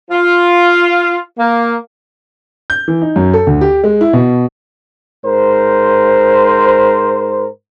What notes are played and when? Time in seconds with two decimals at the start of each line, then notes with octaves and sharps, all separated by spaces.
0.11 F4
1.39 A#3
2.70 G6
2.88 E3
3.02 D#4
3.16 F#2
3.34 A4
3.47 D2
3.61 G4
3.84 G#3
4.01 E4
4.13 B2
5.26 G#2 A#4 C5